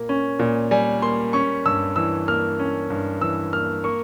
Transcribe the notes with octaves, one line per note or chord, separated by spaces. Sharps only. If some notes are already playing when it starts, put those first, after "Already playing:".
Already playing: A#2 A#3
C#4
A#2
G3 G#5
A#3 C6
C#4 C#6
G2 E6
E3 E6
A#3 F6
C#4
G2
E3 E6
A#3 F6
A#3 C#6